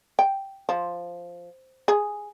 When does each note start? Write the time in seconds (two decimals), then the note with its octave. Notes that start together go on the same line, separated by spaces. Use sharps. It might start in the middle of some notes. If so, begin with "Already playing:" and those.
0.19 G5
0.69 F3
1.88 G#4